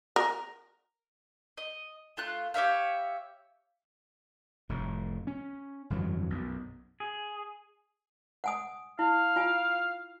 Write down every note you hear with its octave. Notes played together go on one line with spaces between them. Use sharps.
A#4
D#5
A3 F4 F#6
G4 C#5 E5 F5
F1 A2
C#4
G1 F2 E3 F#3
B1 F#2
G#4
F#5 G#5 D#6
E4 F5
F4 G#5